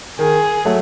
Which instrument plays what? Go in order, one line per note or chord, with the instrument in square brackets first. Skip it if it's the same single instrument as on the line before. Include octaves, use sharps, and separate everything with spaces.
[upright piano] D#3 [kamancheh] G#4
[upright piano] F#3 A3